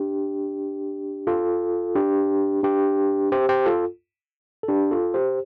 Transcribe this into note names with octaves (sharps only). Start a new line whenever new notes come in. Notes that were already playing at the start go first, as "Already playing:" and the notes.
Already playing: D4 G4
F4 A4
D4 G4
D4 G4
G4 C5
G4 C5
F4 A4
A4
D4 G4
F4 A4
G4 C5